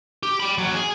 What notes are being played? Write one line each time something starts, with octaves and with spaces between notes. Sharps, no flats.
G4
G5 B5
D#2 F#3
G#4